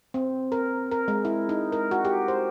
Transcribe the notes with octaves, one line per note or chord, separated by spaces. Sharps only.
C4
A#4
A#4
G#3
E4
D#4
A#4
F#4
G4
C5